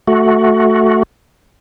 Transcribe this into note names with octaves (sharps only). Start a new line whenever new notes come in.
A3 F#4